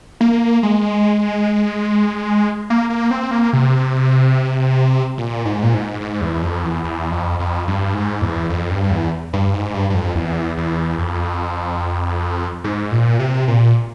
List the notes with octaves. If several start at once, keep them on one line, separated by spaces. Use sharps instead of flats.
A#3
G#3
A#3
A#3
C4
A#3
C3
A#2
G#2
A#2
G#2
G#2
E2
F2
E2
E2
F2
F2
G2
G#2
E2
F2
G2
E2
G2
G#2
G2
G2
F2
E2
E2
F2
G#2
A#2
C3
A#2